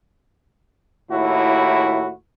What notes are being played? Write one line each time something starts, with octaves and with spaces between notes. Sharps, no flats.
D#2 A2 E4 F#4